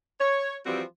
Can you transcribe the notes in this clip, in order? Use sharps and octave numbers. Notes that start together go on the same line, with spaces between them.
C#5
E3 F3 G3 C4 F#4